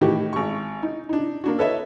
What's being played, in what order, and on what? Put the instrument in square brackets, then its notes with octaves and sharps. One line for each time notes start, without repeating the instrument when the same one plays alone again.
[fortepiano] A2 D#3 E3 F#4 G4
G#1 C#6
D#4
D4 D#4
A#3 D4 F#4
A4 B4 C#5 D#5 E5